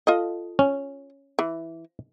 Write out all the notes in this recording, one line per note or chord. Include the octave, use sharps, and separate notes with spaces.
F4 A4 D#5
C#4
E3